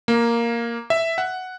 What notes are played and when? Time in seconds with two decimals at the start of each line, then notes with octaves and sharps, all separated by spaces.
0.08 A#3
0.90 E5
1.18 F#5